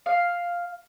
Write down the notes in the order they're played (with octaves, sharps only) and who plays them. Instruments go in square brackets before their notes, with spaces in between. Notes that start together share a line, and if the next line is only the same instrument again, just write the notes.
[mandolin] F5